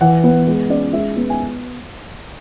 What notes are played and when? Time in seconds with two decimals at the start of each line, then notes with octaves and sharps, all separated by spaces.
0.01 E3 F#5
0.24 B3
0.47 G#3
0.70 C#4 D5
0.93 G#3 E5
1.16 B3
1.30 G#5